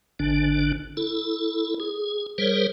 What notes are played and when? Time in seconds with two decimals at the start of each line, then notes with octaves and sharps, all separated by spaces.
0.19 G#1 D3 D4
0.97 E4 A4
1.80 G#4
2.38 G3 G#4 A#4 C5 C#5